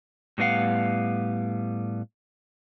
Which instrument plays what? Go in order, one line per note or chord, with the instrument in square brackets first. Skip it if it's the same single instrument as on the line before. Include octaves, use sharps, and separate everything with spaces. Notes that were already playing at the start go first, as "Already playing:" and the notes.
[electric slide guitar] A2 G3 B3 E4 F5 F#5